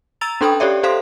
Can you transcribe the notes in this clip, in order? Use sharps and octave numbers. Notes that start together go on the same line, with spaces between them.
A#5 E6 A6 F7
C#4 D4 A4 G5 B5 D#6
G4 A4 C#5 D5 E5
G4 A4 C5 F5 C6